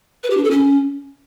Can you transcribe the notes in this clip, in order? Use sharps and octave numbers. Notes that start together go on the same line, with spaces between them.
B4
G4
D4
A4
C#4